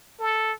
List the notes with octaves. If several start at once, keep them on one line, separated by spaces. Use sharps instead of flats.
A4